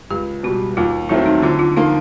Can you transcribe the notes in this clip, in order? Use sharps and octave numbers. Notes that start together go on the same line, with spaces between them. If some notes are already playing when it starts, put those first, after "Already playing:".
C#2 G4
B2 G3 F#4
D#2 F4
D#3 F#3 A3 C4 E4
D#4
D3 F4
F4
F3 A#3 D#4